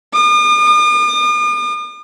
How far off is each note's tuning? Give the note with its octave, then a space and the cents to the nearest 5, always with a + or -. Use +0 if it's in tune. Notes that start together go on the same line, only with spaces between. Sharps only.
D#6 -45